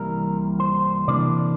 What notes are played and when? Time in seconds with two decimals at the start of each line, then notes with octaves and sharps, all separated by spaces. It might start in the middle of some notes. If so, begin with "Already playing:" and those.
Already playing: C2 C3 E3 G3 A#3 A#4
0.60 C5
1.08 C3 E3 A#3 D4 D5